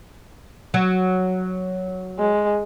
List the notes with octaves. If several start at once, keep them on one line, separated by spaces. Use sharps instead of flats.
F#3
G#3